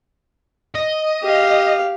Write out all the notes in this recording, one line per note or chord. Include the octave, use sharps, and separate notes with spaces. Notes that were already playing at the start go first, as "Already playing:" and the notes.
D#5
G4 F5